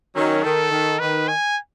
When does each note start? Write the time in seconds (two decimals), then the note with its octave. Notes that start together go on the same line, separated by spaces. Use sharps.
0.15 D#3 F#3 C#4
0.43 D#3 A4
0.72 D#3
1.00 D#3 B4
1.28 G#5